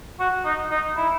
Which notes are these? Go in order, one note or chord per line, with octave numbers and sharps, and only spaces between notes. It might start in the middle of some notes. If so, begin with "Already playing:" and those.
F#4
D#4
D#4
E4